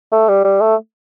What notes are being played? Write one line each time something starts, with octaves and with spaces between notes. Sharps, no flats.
A3
G3
G3
A3